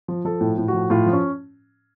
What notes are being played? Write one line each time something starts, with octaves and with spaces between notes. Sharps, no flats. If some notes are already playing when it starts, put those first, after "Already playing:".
F3
F3 A4
A2
A2
F#4
F3
A2 F4
F3
C#4